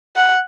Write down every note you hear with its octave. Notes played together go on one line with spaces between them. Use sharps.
F#5